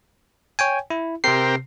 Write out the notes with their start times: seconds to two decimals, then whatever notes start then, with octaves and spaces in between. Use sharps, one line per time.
0.59 C#5 G5 G#5
0.90 E4
1.24 C3 C4 G4 A#4 C7